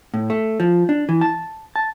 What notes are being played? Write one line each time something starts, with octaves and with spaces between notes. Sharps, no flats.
A2
A3
F3
D4
E3
A5
A5